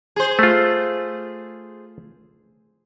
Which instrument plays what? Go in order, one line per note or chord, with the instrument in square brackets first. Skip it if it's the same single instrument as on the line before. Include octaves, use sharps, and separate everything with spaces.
[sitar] G#4 C5
[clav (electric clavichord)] A3 F4